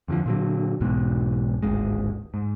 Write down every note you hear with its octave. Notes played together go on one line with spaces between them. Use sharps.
F2 D3 D#3 F3
A#2 D3 F#3
B1 E2 G#2 B2
D1 G#1 G#3
G#2